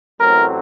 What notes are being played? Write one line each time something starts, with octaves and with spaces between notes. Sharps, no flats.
A1 A2 F#3 C4 A#4